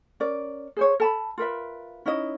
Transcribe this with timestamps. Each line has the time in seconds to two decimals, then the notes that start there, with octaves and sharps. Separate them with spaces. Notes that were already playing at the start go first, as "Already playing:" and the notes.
0.20 C#4 A#4 D5
0.77 G#4 C5 C#5
1.00 A4 A5 B5
1.38 F4 A#4 B4 E5
2.06 C#4 D#4 E4 D#5